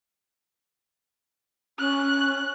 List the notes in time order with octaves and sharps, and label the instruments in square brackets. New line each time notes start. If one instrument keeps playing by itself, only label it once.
[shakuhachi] C#4 [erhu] F#6